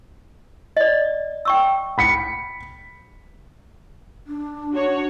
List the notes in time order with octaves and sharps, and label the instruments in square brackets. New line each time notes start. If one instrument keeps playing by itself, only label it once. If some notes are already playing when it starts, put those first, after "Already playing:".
[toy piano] D5 D#5
G5 C#6 E6
[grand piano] B5 B6 C#7
[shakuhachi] D4
[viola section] F#4 C#5